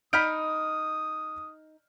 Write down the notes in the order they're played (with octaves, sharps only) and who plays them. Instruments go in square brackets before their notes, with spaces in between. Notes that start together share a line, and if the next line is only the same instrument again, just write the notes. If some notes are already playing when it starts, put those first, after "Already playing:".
[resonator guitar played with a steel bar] D#4 [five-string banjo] D#5 F#5 B5 [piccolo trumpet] D#6 [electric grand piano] F6 G6 D7